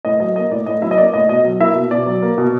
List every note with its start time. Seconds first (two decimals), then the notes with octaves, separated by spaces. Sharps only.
0.05 A2 D#5
0.20 F#3 D#5
0.36 A#3 D#5
0.51 A2 D5
0.66 A2 D#5
0.82 F#3 E4 E5
0.91 D#5
0.98 A#3 D5
1.14 A2 D#5
1.29 B2 D#5
1.44 F#3
1.60 A#3 E4 E5
1.75 B2
1.91 B2 D5
2.06 F#3
2.22 A#3
2.38 B2